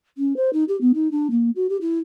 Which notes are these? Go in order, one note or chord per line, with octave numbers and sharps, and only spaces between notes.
C#4
C5
D#4
G4
B3
D#4
D4
A#3
F#4
G4
E4